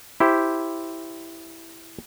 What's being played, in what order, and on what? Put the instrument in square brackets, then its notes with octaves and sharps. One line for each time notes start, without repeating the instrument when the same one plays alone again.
[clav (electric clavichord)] E4 G4 C5